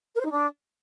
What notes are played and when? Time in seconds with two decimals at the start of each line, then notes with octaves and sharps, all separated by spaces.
0.14 A#4
0.20 C5
0.25 D#4
0.31 D4